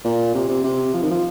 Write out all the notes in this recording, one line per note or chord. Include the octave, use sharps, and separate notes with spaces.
A#2
C3
C3
C3
F3
D#3
F3